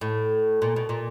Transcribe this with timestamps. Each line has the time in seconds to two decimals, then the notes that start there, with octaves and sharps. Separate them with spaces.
0.01 A2
0.62 A#2
0.76 B2
0.89 A#2